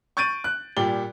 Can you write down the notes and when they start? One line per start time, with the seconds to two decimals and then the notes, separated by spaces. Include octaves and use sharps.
0.17 C#6 G6 A6 D7 D#7
0.44 F#6
0.77 A#2 G3 G4 G7